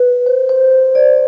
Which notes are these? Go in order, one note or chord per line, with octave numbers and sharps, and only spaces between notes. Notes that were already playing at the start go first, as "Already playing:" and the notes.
Already playing: B4
C5
C5
D5